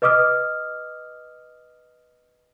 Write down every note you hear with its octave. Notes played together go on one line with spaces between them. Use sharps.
B4 D#5 D6 D#6 F6